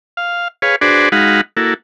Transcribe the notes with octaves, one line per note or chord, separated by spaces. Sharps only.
F5
G#4 B4 C#5 F5
D4 F#4 G#4 B4 C5 D5
G#3 D#4 F#4 F5 F#5 B5
A#3 E4 F#4 A4